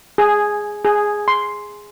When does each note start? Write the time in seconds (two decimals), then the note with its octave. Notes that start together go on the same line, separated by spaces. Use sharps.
0.18 G#4
0.85 G#4
1.28 C6